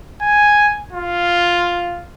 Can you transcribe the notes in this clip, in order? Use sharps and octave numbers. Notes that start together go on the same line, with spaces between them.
G#5
F4